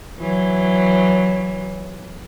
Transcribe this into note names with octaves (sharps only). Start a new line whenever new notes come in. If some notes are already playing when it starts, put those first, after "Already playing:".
E3 F#3